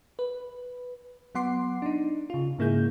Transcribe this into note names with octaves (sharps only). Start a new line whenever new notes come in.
B4
F#3 B3 F#5 C6 D6 C7
D4 D#4
C#3 F4
G#2 C#3 A#3 E4 G#4 G6